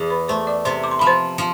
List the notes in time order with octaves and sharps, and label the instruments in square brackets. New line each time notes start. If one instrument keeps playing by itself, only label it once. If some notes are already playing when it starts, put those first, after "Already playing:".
Already playing: [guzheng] E2
[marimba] B4 B5
[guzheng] A3 [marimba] C5 C6
[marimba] D5 D6
[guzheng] C3 [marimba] C5 C6
[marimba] D6
C6
[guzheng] F3 [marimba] B5
[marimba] C5 C6
[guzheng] F3